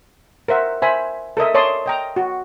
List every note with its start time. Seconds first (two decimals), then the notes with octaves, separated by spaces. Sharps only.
0.48 A#4 C5 E5 F#5
0.82 C5 E5 G#5 B5
1.37 A4 A#4 D#5 E5
1.54 C#5 D5 A5 C6 D#6
1.86 D#5 G5 A#5
2.16 F#4